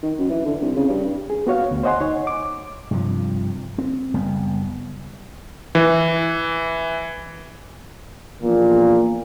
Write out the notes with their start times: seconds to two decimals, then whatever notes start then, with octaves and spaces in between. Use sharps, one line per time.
0.03 D#3
0.18 F#2
0.30 E3
0.45 D3
0.62 C2
0.76 C#3
0.89 G2
1.30 G#4
1.47 B3 F#4 C#5 F5
1.71 D2
1.83 C5 C#5 D#5 F#5 G#5 C6
2.00 D#4 C#5
2.27 D6
2.91 G2 C3 F3
3.78 C4
4.14 F#1 G3 B3
5.75 E3
8.42 A#1 E2 A#2